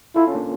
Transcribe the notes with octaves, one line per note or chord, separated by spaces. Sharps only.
E4 F4 A4
C#4
A#3 D4